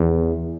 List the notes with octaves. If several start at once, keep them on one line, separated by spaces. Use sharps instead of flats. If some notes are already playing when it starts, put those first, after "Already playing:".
Already playing: E2